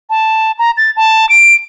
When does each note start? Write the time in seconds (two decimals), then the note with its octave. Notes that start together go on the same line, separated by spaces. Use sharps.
0.10 A5
0.59 A#5
0.77 A6
0.97 A5
1.29 D7